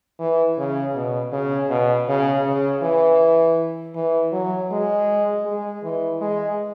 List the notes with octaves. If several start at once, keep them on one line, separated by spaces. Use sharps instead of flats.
E3
C#3
B2
C#3
B2
C#3
C#3
E3
E3
F#3
G#3
G#3
E3
G#3